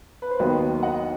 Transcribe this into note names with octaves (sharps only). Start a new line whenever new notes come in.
B4
C5
D#2 D#3 F#3 B3 B4 D#5
D#5 F#5